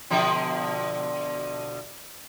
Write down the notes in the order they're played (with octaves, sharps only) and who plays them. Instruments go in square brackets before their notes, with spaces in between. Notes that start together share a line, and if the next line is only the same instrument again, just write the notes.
[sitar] B2 D3 F3